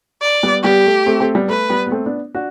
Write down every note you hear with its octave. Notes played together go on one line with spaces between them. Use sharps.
D5
G3 B3
G3 B3 G4
A3
A3 C4
A3 C4
G3 B3
A3 B4
G3 B3
B3
A3 C4
B3 D4
D4 F#4